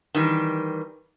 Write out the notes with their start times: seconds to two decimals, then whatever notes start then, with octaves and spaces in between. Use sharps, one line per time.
0.15 D#3 E3 G3